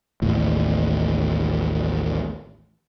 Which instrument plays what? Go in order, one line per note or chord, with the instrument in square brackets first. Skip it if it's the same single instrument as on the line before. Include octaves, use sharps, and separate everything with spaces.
[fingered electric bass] A1 D#2 A2